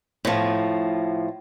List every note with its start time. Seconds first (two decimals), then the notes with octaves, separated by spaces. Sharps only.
0.25 A2 F3